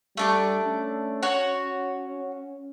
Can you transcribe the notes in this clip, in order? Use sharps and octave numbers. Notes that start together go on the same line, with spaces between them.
G3 A3 D4 D6
C#4
F#4 C#5 C#6